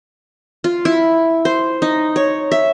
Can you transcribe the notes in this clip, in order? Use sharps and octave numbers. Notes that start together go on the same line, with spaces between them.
F4
E4
C5
D#4
C#5
E5